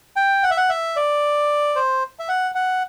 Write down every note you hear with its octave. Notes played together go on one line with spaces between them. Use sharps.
G5
F#5
E5
F#5
E5
D5
C5
E5
F#5
F#5